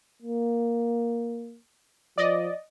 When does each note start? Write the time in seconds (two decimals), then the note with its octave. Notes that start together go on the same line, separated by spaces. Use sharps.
0.22 A#3
2.18 F3 D5 D#5